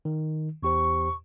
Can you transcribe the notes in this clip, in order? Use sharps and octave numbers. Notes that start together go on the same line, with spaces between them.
D#3
E2 G4 C5 C#6